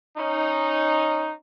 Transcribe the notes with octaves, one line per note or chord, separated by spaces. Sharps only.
C#4 D#4